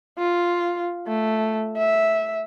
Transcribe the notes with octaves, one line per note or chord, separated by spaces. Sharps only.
F4
A3
E5